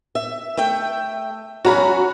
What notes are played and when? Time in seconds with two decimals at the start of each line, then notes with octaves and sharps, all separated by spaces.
0.15 E5
0.57 A3 E5 G5
1.65 F#3 C#4 F#4 A#5 B5